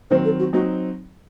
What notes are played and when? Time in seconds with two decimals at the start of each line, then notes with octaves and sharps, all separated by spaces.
0.11 D#3 F#3 C4 C5
0.25 A4
0.39 F#4
0.53 F#3 C4 D#4 F#4